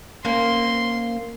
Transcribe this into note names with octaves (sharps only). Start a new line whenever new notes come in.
A#3 C4 C#4 C6